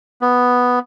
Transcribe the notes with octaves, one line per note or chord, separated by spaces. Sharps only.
B3